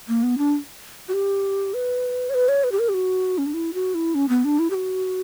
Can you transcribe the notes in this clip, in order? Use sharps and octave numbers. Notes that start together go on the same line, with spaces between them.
A#3
B3
D4
F#4
G4
B4
C#5
B4
C#5
B4
G4
A#4
G4
F#4
C#4
D4
E4
F#4
E4
C#4
B3
D4
E4
G4
F#4